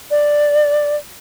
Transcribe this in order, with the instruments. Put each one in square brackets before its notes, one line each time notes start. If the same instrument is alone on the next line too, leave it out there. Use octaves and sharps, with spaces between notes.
[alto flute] D5